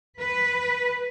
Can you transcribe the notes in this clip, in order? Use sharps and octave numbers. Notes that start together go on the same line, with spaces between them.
B4